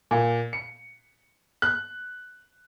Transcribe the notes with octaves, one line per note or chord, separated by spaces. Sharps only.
A#2
C#7
F#6